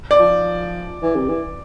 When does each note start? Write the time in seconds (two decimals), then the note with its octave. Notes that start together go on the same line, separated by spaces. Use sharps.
0.11 D5
0.19 F3
1.02 E3
1.15 C3
1.29 E3